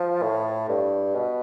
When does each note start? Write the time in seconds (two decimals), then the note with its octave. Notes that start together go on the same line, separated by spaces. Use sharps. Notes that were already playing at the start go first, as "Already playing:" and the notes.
Already playing: F3
0.22 A2
0.69 G2
1.15 B2